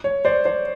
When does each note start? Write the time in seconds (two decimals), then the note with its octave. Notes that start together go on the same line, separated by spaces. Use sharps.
0.04 C#5
0.25 C5 D5
0.45 C5 D5